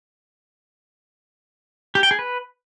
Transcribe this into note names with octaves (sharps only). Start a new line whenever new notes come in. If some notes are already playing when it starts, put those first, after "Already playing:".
G4
G5
G#4
B4